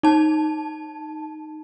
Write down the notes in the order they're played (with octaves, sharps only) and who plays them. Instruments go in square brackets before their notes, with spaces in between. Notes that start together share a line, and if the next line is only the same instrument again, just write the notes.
[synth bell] D#4 A5